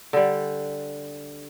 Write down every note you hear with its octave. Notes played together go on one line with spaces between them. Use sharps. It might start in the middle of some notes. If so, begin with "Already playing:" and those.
D3 G3